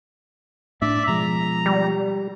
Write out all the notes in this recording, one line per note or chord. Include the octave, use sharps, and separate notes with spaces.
A2 D4 D5 E5
B2 F3 G#3 A#5
G3